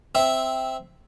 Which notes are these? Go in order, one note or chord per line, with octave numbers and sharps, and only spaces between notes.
C4 E5